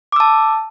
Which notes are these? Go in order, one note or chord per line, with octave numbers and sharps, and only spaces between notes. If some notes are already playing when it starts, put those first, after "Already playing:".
A5 D6 E6